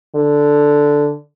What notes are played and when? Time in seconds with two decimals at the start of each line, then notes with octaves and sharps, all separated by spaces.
0.15 D3